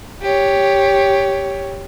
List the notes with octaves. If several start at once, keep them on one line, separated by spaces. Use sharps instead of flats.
G4 C#5